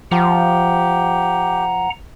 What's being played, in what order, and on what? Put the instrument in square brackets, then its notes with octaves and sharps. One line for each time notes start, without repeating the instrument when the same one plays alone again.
[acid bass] F3 [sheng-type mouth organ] G4 [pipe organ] F#5 A#5